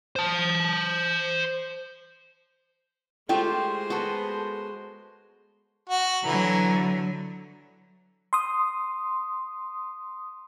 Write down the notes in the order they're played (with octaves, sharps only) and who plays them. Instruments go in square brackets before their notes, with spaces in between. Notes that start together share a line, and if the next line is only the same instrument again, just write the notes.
[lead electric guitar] C5 A5
[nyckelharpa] G#3 C5 [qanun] A3 F4 G4 [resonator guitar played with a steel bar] G5
[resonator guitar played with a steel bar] B3 A4 [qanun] F#4
[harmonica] F#4
[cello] D3 F#3 [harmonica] E3 A#5
[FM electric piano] C6 D#6